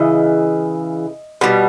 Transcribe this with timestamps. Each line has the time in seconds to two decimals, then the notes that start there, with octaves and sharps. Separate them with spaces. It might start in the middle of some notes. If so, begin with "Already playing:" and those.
Already playing: C#3 E3 D#5
1.41 B2 G3